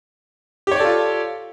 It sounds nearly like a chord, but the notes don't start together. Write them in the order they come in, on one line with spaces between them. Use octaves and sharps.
G4 C#5 D5 A4 F4